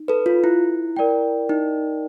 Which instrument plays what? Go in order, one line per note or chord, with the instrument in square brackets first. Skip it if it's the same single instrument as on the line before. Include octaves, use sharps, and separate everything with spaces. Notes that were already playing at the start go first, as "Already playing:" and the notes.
Already playing: [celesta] D#4
[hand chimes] A4 B4
F4
E4
[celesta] A#4 D5 G5
[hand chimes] D#4